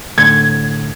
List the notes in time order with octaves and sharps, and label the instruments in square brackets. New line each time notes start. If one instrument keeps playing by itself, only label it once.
[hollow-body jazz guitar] A2 D3 A3 [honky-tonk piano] G#6